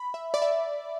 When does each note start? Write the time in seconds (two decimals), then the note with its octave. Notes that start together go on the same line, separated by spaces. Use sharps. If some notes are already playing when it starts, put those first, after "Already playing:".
Already playing: B5
0.14 E5
0.34 D5
0.42 E5